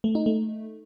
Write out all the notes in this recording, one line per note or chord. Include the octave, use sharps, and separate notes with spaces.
A3
D#4
A3